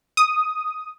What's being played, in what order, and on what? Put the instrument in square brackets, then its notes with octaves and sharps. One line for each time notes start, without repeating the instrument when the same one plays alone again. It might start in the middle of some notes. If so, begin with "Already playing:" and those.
[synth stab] D#6